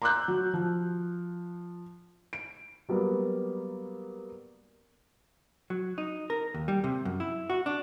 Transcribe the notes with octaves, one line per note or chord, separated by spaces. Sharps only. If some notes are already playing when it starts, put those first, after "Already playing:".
A#5 C6 D6 E6 F#6 G6
F#3
F3
D7
F#3 G3 A#3 B3
F#3
D#4
A#4
D#2
G3
C3
F#2
E4
F#4
D4